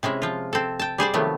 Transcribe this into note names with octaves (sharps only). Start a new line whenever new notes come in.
C3 G#3 C#4 E4
F3 F4
C4 A4
G5 A5
G3 G#4 C5 D5
C3 D#3 F3 F#3 A3 B3